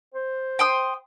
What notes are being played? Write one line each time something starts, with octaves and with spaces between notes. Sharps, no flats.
C5
G5 C6 D#6